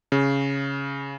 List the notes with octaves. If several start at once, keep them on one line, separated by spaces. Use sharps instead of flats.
C#3